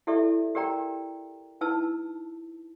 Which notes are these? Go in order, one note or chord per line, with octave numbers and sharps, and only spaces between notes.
E4 G4 A4 D5 E5
G4 A#4 D5 G5 A#5
D#4 E4 B4 A5 E6